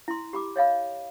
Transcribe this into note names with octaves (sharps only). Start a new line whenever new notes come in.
E4 C6
G4 B5 D6
C#5 D#5 F5 B5